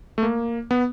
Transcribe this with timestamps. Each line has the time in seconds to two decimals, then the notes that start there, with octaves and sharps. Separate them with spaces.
0.18 A3
0.23 A#3
0.71 B3